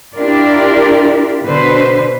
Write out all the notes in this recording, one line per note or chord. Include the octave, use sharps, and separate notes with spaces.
D4 E4 F4 G4 A#4 D5
B2 D3 B4 C5